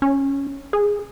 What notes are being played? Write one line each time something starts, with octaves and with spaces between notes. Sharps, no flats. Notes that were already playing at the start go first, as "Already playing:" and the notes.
C#4
G#4